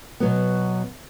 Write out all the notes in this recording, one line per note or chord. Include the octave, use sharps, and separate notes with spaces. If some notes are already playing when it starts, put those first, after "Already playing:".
B2 F#3 B3